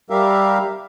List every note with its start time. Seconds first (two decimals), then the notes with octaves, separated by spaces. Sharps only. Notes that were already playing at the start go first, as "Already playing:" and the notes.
0.10 G3 G4 A#4 E5 F5